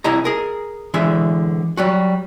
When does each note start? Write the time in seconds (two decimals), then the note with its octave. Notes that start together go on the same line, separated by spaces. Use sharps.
0.04 C2 E4 D#5 A#5
0.25 G#4 A#4
0.94 D3 E3 G#3 E5
1.77 F#3 G3 F#4